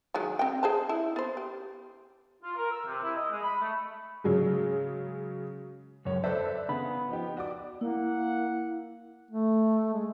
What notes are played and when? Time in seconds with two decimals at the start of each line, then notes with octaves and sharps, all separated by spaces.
0.14 D#3 F#3 G#3
0.39 C4 G5
0.63 G#4 C5 A5
0.89 E4
1.16 B3 C5
1.37 G4
2.43 F4
2.57 A#4
2.71 E6
2.85 C3
3.02 E4
3.16 D#5
3.31 G#3
3.42 B5
3.61 A3
4.24 C#3 F#3 G#3
6.05 C#2 F#2 C#5
6.24 A4 B4 C5 D5 E5 A5
6.69 C#3 B3 B5
7.09 F3 D#4 G4
7.37 F#4 D5 D6
7.81 A#3 E4 F#5
9.31 A3
9.94 G#3